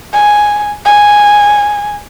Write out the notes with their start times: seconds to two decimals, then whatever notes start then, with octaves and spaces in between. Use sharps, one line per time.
0.13 G#5
0.85 G#5